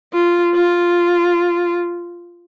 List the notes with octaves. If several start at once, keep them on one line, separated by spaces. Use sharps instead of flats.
F4
F4